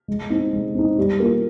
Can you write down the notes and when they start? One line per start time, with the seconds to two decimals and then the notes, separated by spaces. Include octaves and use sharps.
0.08 G#3
0.30 C4 D#4
0.53 G#3
0.75 C4 D#4
0.97 G3
1.20 A#3 F4